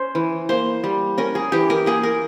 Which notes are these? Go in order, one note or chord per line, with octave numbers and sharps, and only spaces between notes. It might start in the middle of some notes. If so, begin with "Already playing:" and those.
Already playing: C#4 C5
E3
A#3 C5
G3
C#4 A#4
G#4
E3 G4
A#4
A#3 G#4
A#4